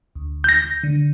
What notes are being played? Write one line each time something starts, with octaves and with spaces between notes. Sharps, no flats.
D2
G6 A#6
D3